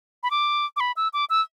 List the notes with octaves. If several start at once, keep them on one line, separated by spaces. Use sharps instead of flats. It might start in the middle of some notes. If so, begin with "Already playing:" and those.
B5
D6
D6
B5
E6
D6
E6